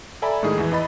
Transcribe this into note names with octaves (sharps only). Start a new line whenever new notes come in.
A4 D5 E5 G#5 A#5 B5
A2 D#3 G#3 G#4
E2 E3
E2 E3 D#5 B5 A6